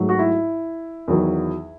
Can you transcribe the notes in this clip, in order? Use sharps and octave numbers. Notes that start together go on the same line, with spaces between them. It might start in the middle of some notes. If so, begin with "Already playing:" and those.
Already playing: G#2 F#3 A3
F#4
E4
E2 D#3 F#3